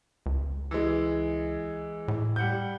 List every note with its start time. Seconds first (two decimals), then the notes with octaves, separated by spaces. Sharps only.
0.26 C#2
0.71 E3 G#3
2.08 A2
2.36 G3 F#5 G6